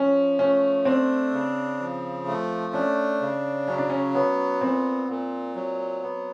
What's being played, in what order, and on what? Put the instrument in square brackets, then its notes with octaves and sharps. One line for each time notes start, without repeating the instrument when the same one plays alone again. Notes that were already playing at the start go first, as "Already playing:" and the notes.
Already playing: [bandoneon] F3 [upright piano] C#4
[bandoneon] A3 [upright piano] C#4
[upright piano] C4 [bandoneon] D4
[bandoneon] C#3
F3
A3
[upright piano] C#4 [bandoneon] D4
[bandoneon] C#3
[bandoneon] F#3 [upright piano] C#4
[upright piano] D4
C#4
[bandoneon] B3 [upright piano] C#4
[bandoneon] A#2 [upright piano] C4
[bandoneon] A#2
F#3
B3